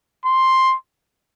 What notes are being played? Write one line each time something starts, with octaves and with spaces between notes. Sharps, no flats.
C6